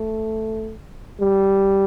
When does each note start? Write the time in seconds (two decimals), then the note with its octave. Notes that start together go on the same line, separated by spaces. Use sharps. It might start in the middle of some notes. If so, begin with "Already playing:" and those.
Already playing: A3
1.21 G3